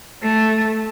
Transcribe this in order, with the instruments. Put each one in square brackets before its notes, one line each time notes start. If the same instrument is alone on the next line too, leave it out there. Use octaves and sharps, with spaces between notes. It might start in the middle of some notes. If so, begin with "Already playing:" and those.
[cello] A3